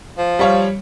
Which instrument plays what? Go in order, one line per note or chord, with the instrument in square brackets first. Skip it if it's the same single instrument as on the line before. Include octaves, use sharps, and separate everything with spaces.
[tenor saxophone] F3
[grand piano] G3 C#5 F5